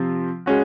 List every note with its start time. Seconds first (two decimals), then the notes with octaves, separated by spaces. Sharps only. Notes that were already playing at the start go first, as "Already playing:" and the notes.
Already playing: C3 F3 C4 F4
0.46 G#3 C#4 F#4